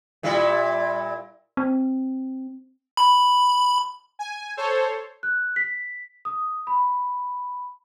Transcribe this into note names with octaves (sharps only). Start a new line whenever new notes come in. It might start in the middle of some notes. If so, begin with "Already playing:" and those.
A#2 G3 E4
C4
B5
G#5
A4 C5 C#5
F#6
B6
D#6
B5